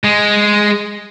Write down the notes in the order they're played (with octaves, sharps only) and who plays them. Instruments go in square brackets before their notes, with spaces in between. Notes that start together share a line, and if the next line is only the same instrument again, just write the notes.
[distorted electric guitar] G#3